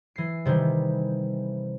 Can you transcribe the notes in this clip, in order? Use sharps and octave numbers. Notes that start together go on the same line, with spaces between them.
E3 C7
C3 D#3 E3 G3